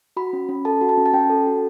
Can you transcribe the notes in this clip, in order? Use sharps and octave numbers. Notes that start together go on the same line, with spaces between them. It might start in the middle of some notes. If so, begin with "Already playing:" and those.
F#4 B5
C#4
C#4
A4 A5
F#4
A5
C#4
A5
C#4 G5
A4
F#4